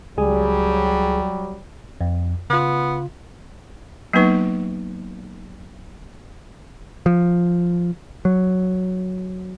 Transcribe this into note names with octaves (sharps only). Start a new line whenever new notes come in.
C#2 F#3 G3 G#4 G#5
F2
C#3 B3 F4
F#3 A#3 B3 D#4 B4 C#6
F3
F#3